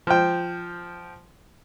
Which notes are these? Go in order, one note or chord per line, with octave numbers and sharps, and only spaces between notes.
F3 G5